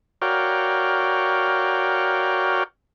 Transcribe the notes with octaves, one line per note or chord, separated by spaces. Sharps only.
F#4 A#4 C#5 D5 F5 G5